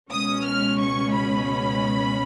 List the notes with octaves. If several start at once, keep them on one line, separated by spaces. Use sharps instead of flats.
C#2 B2 G#3 C#4 D#6
F6
C#6
B5